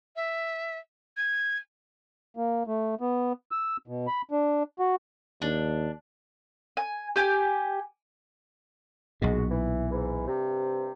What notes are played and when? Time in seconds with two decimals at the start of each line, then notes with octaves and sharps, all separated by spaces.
0.16 E5
1.17 G#6
2.37 A#3
2.67 A3
3.01 B3
3.51 E6
3.87 B2
4.07 B5
4.31 D4
4.79 F#4
5.42 D#2 D4
6.77 G#5
7.16 G4 G#5
9.22 B1 A#2 G#3 F#4
9.50 E3
9.91 G#2 E3
10.27 G2 C3